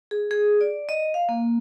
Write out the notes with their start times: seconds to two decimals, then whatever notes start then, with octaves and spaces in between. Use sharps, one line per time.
0.11 G#4
0.31 G#4
0.61 D5
0.89 D#5
1.14 F5
1.29 A#3